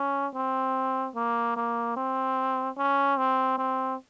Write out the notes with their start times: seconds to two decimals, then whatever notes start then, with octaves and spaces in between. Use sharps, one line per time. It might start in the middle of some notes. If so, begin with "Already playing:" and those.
Already playing: C#4
0.35 C4
1.15 A#3
1.56 A#3
1.97 C4
2.78 C#4
3.17 C4
3.58 C4